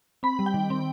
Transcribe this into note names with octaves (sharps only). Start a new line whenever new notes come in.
C4 B5
G3
G5
D#3
C4